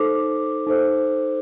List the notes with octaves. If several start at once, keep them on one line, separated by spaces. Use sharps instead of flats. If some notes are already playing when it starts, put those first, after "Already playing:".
Already playing: D#4 A4 C5 D6
D#4 A4 C5